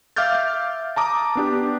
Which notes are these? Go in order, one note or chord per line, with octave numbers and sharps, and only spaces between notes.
E5 F5 D6 F6 G6 A6
A5 A#5 D6 D#6
B3 D4 G4